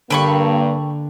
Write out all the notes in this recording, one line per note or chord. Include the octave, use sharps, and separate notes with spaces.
G2 D3 A#3 G5 B5 C#6